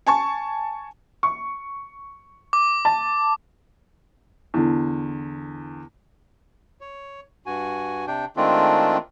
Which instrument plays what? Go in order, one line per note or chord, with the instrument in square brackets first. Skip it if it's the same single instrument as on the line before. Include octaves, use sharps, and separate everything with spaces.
[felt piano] G#5 A5 C#6
[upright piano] C#6
[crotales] D6
[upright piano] A5
E2 D3
[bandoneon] C#5
G2 F#4 G#5
C3 D4 G5
D#3 G#3 A3 C4 D4 F4